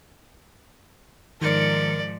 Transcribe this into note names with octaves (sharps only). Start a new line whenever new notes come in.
G#2 D#3 F3 A#4 D5 C#7